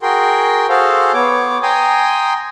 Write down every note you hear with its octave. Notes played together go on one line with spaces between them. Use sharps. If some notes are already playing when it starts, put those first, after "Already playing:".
F#4 G#4 A#4 G5 C6
F#4 G#4 A4 C5 F5
B3 C#5 D6
G5 G#5 A#5 C6 D#6